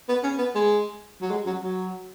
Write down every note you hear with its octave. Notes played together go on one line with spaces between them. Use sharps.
B3
C#4
B3
G#3
F#3
G#3
F#3
F#3